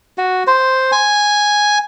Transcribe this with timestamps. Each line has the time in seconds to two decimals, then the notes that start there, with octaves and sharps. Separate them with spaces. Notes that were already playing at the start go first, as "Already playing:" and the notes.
0.18 F#4
0.47 C5
0.92 G#5